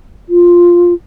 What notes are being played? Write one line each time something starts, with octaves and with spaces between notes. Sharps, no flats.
F4